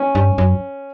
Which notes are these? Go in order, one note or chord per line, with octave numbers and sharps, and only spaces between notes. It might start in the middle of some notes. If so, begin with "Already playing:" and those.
Already playing: C#4
G2
F#2